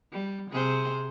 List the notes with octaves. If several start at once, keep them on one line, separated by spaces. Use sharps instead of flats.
G3
C3 G#4 C5